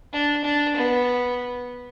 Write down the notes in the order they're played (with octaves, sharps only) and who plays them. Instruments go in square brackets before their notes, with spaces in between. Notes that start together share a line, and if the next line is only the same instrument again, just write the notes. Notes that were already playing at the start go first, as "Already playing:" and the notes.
[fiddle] D4
D4
B3